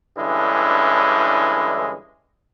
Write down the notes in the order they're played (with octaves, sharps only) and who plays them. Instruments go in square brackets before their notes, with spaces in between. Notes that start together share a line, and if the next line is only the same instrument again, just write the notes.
[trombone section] G2 D3 E3 G#3 C#4 E4